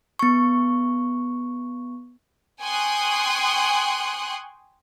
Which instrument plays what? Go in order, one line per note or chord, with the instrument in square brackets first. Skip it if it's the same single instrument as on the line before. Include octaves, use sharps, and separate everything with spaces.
[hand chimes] B3 C#6
[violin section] G5 G#5 C6 C#6 D#6 F#6